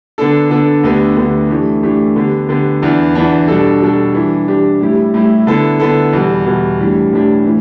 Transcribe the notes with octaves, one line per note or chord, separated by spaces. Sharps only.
D3 B3 D4 A4
D3 B3 D4 A4
D2 D3 B3 G4
D2 D3 B3 G4
E3 A3 D4 G4
E3 A3 D4 G4
D3 B3 G4
D3 B3 G4
E2 E3 B3 D4
E2 E3 B3 D4
B2 G3 D4 A4
B2 G3 D4 A4
E3 G3 D4 G4
E3 G3 D4 G4
A2 G3 E4 G4
A2 G3 E4 G4
D3 B3 E4 A4
D3 B3 E4 A4
E2 B2 G3
E2 B2 G3
A2 E3 G3 D4 G4
A2 E3 G3 D4 G4
A2 E3